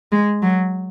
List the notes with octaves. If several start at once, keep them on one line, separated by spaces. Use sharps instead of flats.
G#3
F#3